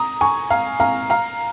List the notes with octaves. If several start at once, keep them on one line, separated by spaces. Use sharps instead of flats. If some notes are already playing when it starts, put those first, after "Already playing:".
Already playing: A#5 D#6
G#5 C#6
F5 A#5
F5 A#5
F5 A#5